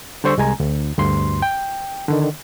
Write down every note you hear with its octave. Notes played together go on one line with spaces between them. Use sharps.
D3 G3 C5 C#6 E6
C2 G#3 G#5 A#5
D2
D2 G2 C6
G5
D3 D#3